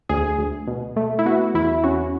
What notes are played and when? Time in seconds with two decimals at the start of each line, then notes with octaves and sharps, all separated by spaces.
0.09 D2 G#4
0.38 D2
0.67 B2
0.96 A3
1.19 E4
1.26 B3 F#4
1.54 E2 E4
1.84 C#4 F#4